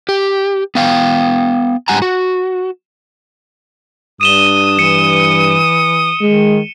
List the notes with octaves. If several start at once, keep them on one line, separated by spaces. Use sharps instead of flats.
G4
B3 F5 G5
G#2 G3 F#5 G#5 A#5
F#4
G2 D4 D#6 D#7 E7 G7
E3 C#7
D#3 G#3